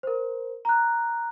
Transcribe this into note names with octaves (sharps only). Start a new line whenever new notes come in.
A#4 C5
A#5 F#6